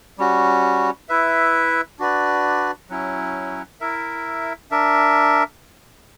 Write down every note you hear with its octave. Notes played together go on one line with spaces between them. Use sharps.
G3 C#4 F#4
E4 B4 E5
D4 F#4 B4 D5
F#3 C#4 E4
E4 A#4 E5
D4 A#4 E5